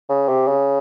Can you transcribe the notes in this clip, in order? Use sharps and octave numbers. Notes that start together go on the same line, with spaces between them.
C#3
C3
C#3